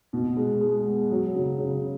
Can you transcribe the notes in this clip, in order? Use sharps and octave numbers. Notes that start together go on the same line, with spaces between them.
B2
G#3
G#3
B3
F#3
C#3
C#3